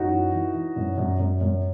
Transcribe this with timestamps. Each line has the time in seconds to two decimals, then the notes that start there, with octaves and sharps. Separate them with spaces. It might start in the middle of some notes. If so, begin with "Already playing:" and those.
Already playing: F#2 D#4 F#4
0.11 E3
0.33 E3
0.54 E3
0.76 F#2
0.98 F#2
1.19 F#2
1.41 F#2